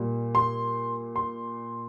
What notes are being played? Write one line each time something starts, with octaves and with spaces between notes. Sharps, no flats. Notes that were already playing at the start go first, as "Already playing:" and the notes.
Already playing: A#2 G3 A#3
C6
C6